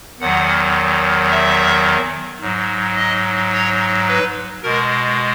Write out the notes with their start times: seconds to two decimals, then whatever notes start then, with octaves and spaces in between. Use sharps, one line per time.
0.20 E2 D#3 F#3 F#5
1.31 E5
2.41 G#2 F#3
2.97 D#5
3.53 C#5
4.08 B4
4.63 B2 G#3 A#4